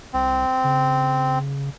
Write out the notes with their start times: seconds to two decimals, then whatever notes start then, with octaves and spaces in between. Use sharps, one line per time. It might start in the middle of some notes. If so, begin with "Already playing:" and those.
0.14 C2 C4
0.64 C#3